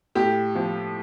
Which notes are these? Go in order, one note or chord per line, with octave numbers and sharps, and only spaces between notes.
A2 G4
F3